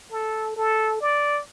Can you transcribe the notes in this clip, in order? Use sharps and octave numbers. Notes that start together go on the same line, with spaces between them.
A4
A4
D5